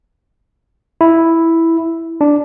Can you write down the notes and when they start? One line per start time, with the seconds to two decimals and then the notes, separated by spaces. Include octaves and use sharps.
1.01 E4
2.21 D4